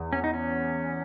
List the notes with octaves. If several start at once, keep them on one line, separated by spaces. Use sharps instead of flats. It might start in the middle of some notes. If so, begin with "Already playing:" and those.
Already playing: E2
C#4
D#4
C#4